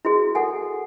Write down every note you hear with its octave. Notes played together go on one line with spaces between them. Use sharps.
E4 F#4 G#4
A4 F#5 G#5